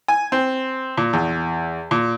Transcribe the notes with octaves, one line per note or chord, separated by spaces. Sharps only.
G#5
C4
A#2
E2
A#2